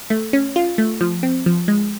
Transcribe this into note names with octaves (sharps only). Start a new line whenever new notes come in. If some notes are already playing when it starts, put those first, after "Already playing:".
A3
C#4
F4
A3
F3
C4
F3
G#3